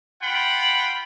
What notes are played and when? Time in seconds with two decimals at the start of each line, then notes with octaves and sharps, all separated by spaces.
0.22 F4 F#5 G5 B5